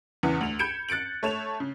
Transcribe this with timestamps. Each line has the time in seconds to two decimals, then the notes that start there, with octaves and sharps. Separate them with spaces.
0.23 E2 C#3 E3 C#7
0.41 D2 F7
0.59 B5 G6 G#6 C#7 D7 E7
0.89 F#6 A6 C#7 D7 F#7
1.23 A3 C#5 E7 F7
1.60 C#3